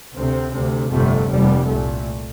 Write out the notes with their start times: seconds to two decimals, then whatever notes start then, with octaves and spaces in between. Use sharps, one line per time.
0.15 D2 C3 C4
0.53 D2 C3
0.91 G1 F2 C3 A3
1.29 F1 D#2 G3
1.66 C2 A#2 A3